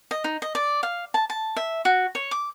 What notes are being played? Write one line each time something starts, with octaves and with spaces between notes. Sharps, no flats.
D#5
D#4
D#5
D5
F5
A5
A5
E5
F#4
C#5
D6